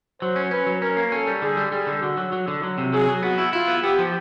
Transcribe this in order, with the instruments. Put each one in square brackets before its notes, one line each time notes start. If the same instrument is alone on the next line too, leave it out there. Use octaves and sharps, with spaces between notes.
[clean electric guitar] F#3 [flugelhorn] C5
[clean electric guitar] C#4
[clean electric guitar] C#4 [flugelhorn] B4
[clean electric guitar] F#3
[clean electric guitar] C#4 [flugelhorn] A#4
[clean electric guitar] A#3
[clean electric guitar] C#4 [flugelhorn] A4
[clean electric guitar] G3
[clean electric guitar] D3 [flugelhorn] G#4
[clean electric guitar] G3
[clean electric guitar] G3 [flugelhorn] G#4
[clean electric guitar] D3
[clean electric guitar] D3 [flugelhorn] F#4
[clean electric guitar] F#3
F#3
D3
F#3
C3
[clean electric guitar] F#3 [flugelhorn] G#4
[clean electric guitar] F#3
[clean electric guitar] B3 [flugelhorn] F#4
[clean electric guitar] E4
[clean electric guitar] E4 [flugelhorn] F4
[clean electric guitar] B3
[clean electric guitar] B3 [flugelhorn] G4
[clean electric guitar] F3